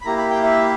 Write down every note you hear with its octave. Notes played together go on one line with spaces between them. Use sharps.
B5
A#3 E4 G4 A#5
B5
G5
E5